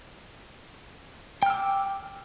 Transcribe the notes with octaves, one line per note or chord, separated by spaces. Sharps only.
G5 D6 E6 F6